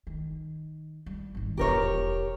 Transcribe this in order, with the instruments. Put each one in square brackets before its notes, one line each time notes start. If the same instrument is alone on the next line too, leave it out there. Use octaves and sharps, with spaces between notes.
[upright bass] D#3
G3
G#1 D#3
[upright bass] D#1 E2 [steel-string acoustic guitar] G4 A#4 C#5